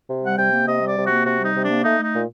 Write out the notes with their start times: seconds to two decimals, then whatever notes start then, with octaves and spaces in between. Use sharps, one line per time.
0.08 C3
0.22 G3 F#5
0.37 C3 G5
0.52 A#3
0.66 C3 D#5
0.80 G3
0.86 D5
0.96 C3
1.05 A#3 F#4
1.25 C3 F#4
1.39 G3
1.44 D#4
1.54 C3
1.64 A#3 D4
1.83 A3 D#4
1.98 A3 D#4
2.12 A#2